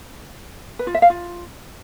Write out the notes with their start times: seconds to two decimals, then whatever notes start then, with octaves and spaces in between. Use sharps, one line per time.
0.79 B4
0.87 F4
0.95 E5
1.02 F5
1.10 F4